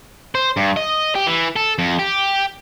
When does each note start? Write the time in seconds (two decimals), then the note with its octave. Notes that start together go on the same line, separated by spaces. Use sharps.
0.35 C5
0.57 G2
0.76 D#5
1.15 G4
1.27 E3
1.56 A4
1.78 F2
1.99 G4